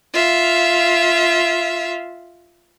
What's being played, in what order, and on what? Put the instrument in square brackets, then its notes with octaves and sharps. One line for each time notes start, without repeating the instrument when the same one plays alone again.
[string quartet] F4 E5 F5